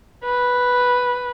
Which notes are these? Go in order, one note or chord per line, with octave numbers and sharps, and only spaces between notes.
B4